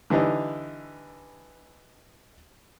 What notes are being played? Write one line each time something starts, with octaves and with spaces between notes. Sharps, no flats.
D3 E3 G3 D#4